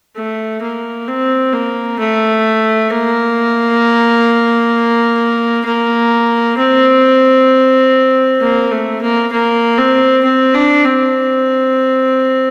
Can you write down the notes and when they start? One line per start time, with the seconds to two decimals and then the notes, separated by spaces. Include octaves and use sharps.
0.16 A3
0.62 A#3
1.08 C4
1.53 A#3
1.99 A3
2.91 A#3
5.65 A#3
6.57 C4
8.41 A#3
8.71 A3
9.02 A#3
9.32 A#3
9.78 C4
10.24 C4
10.54 D4
10.85 C4